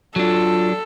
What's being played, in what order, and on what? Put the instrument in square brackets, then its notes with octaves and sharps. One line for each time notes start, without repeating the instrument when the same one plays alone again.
[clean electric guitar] F#3 D4 [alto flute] F4 [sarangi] A4